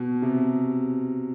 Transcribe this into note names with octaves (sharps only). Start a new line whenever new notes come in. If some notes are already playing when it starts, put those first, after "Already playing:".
Already playing: B2
C3